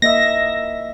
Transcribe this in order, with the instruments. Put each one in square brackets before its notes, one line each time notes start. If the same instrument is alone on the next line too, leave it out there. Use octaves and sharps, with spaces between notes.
[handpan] A#3 D#5 E5 [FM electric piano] A#6